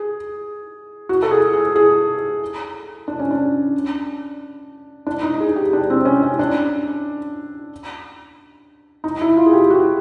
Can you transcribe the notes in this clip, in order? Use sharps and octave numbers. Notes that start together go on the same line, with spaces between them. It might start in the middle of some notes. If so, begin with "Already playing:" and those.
Already playing: G#4
F#4
A4
G#4
G#4
G#4
D4
C#4
D4
D4
D#4
G#4
G4
D4
C4
C#4
C#4
D4
D#4
E4
F4
G#4
G4
F#4